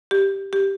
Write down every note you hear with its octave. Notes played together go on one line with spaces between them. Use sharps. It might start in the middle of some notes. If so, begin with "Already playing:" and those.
G4
G4